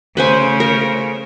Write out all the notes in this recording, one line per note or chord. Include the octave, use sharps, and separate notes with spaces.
C#3 A3 B4 C5 G#5
A#4